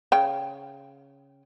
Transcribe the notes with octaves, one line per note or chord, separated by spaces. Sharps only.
C#3 G5